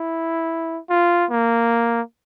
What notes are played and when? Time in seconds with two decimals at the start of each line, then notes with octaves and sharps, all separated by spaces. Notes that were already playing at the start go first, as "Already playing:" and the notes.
Already playing: E4
0.90 F4
1.31 A#3